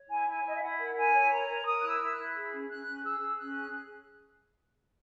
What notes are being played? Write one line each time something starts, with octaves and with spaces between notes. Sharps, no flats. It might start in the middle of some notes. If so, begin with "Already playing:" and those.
Already playing: C#5
E4 G#5
E4 G#5
C#5
E4 D#5
E5
E4 F#5
A#4
E4 G#5
C#5
A#4 A#5
A#4
A#4 D#6
E4 F#6
E6
E4 E6
F#6
E4
G#4
C#4
C#4 F#6
C#4
G#4 E6
G#4
C#4 F#6
G#4